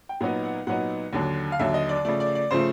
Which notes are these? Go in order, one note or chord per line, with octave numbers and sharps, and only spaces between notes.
G5
A#2 F#3 B3 D#4 F#5
F#5
A#2 F#3 B3 D#4 F#5
D#2 D3 F#3
F5
D#2 D3 F#3 E5
D#5
D5
C#3 F3 A3 D5
D5
D5
C#3 F3 A3 C5